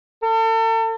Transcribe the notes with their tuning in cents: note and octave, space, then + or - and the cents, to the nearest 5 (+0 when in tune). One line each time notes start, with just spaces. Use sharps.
A4 +40